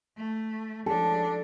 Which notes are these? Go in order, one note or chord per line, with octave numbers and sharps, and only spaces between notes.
A3
F3 D4 A4